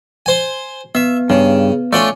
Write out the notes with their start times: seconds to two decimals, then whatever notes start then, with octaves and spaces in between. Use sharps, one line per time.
0.26 C5 G#5
0.95 B3 E5
1.30 G2 C#3 B3
1.93 A3 C#4 F4 D5